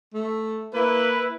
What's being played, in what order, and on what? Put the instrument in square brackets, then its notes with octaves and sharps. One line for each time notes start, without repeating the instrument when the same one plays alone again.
[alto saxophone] A3
[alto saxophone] A#3 [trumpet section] E4 B4